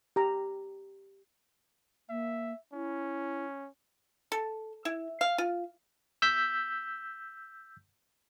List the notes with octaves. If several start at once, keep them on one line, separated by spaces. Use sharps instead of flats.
G4 A#5
A#3 E5
C#4 E4
A4
E4
F5
F4
E6 G6 B6